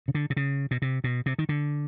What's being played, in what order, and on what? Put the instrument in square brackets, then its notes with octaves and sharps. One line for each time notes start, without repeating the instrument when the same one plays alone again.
[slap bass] C#3
D3
C3
C#3
B2
C3
B2
C3
D#3
D3